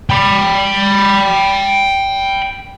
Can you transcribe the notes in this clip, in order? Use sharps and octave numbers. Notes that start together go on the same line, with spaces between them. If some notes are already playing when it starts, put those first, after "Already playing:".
G5 B5